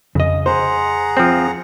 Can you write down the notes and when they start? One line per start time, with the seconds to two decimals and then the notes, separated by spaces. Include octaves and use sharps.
0.15 F2 C#3 D#5
0.46 G#4 C5 F#5 A#5
1.17 F3 C4